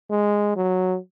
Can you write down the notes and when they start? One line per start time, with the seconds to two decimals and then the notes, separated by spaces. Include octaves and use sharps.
0.10 G#3
0.56 F#3